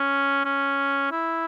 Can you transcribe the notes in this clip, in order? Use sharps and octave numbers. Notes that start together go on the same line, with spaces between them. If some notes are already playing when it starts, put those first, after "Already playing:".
Already playing: C#4
C#4
E4